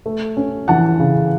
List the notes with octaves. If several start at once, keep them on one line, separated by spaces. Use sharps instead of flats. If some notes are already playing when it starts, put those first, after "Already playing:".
A3
C#4
E3 F#5 A5
C#3